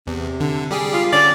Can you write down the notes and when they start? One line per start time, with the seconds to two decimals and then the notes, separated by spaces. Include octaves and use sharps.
0.07 E2 C3
0.40 D3
0.71 G3 G4 G#4
0.93 F4
1.12 D3 C#4 D5